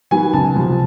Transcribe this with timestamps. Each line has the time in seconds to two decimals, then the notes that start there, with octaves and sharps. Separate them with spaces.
0.11 D#3 F#3 B3 G#5
0.33 C#2 A5
0.55 C3 F3